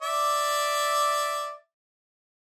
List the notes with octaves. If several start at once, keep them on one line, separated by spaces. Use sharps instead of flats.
D5 E5